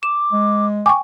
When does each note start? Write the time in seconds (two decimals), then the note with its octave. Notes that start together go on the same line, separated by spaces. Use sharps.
0.03 D6 E7
0.33 G#3
0.86 G5 G#5 C#6 D6